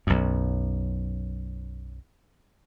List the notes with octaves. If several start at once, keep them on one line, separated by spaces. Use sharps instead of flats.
B1 F#2